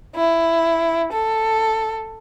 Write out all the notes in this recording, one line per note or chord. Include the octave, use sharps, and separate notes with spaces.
E4
A4